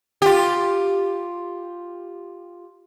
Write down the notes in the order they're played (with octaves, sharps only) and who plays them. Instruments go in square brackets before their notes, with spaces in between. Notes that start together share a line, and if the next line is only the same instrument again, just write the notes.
[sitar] F4 G4